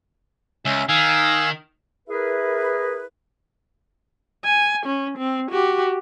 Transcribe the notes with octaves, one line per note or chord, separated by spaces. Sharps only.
C#2 C#4 E5
D#3 F5 G#5 E6
E4 G#4 A#4 B4
G#5
C#4
C4
F#4 G4